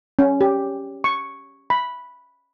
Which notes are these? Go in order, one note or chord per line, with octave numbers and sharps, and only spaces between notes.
C#4
G4
C#6
B5